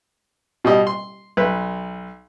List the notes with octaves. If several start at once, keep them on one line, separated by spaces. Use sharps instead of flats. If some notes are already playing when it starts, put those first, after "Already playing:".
B2 G3 D#5
C6
B1 B4